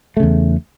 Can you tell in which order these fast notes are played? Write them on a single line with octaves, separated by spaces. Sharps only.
A3 C#3 E2